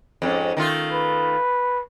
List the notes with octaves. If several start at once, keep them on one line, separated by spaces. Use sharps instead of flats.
F2 G#2 C#4
D#3 A3 F4
B4